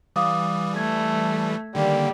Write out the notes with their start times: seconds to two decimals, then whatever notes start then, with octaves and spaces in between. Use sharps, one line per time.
0.16 E3 G3 F5 D6 D#6
0.76 A3 G#6
1.75 D3 D#3 G3 A#3